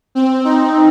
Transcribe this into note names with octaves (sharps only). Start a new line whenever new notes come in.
C4
D#4